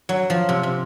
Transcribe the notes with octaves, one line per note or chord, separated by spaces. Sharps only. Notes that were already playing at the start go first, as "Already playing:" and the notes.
F#3
F3
C3
C3